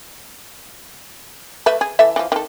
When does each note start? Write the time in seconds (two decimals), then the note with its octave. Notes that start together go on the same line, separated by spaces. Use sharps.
1.66 A3 B4 E5
1.81 G#4
1.99 E3 A4 E5
2.16 E3 F3
2.32 D#3 A4